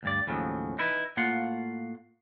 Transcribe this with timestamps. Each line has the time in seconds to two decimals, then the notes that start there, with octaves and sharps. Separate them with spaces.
0.03 D2 G2 D5
0.27 D#2 A2 C#3 F3 F#3
0.79 D#4 E4 B4
1.17 A2 A#3 F4 F5 F#5